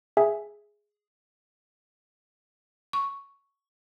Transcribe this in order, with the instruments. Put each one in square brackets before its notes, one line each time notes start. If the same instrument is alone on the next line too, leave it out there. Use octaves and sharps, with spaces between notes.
[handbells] G#4 E5 G#5
[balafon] C#6